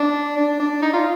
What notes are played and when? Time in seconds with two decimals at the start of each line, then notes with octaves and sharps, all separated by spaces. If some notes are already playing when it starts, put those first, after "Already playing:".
Already playing: D4
0.37 D4
0.60 D4
0.82 D#4
0.93 F4